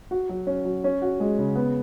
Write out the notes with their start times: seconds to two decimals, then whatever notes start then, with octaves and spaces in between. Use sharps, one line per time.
0.11 F#4
0.29 F#3
0.47 C#4
0.65 F#3
0.84 C#4
1.02 F#4
1.20 G#3
1.39 C#3
1.56 B3